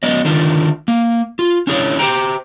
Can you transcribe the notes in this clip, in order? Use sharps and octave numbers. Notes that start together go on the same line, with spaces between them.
F#3 B3 D5 D#5
D3 D#3 D4 F4
A#3
F4
C#4 D4 E4 G#4 B4 C#5
G4 C5 G5 A#5